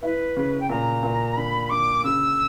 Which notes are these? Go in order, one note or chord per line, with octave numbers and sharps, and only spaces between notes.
E4 B4
C#3
G5
A#2 A#5
A#2
D3 B5
D3 D6
C#3 E6